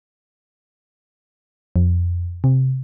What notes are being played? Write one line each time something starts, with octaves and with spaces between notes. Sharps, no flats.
F2
C3